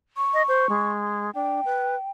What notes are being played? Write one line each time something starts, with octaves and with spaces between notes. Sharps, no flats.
C#6
D#5
C5
G#3
D4 G5
B4